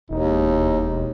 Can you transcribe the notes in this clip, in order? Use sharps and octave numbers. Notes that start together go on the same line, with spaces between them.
E1 D#2 D#4